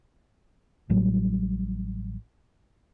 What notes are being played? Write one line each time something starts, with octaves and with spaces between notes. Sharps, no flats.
A1 A2 F#3 G3